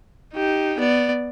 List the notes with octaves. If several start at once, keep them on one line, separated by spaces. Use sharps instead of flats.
D#4 G4
B3 D5